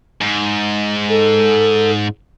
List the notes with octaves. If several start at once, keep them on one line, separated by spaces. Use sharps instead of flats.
G#2
A4